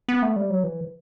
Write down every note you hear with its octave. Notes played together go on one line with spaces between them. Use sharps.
B3
A3
G3
F#3
E3